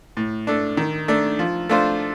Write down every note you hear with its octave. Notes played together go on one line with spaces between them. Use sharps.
A2
A3 D4
D#3
A3 D4
F3
A3 D4 F4 C5